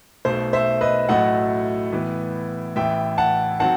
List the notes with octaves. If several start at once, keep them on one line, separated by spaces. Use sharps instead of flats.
B1 B2 A3 C5
C5 E5
B4 D#5
A1 A2 F#3 A3 E4 D#5 F#5
A2 E3 B3
A1 A2 E3 E5 G5
F#5 A5
D#3 F#3 C4 F#5 A5